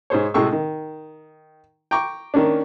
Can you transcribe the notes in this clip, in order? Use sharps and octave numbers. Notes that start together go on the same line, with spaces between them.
G#2 G#4 C5 C#5
A2 C3 G#3 C4 C#6 E6
D#3
G5 A#5 C#6 D6
D#3 A#3 C#4 D4